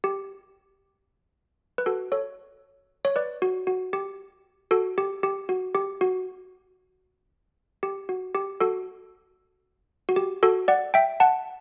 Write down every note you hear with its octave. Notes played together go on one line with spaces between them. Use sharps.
G4
B4
F#4 A4
A4 C#5
C#5
B4 D5
F#4
F#4
G4
F#4 A4
G4
G4
F#4
G4
F#4
G4
F#4
G4
F#4 A4
F#4
G4
F#4 A4
D5 F#5
E5 G5
F#5 A5